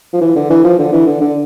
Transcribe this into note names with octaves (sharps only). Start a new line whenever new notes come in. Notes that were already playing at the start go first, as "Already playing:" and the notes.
F3
E3
D3
E3
F3
D3
E3
D3
D3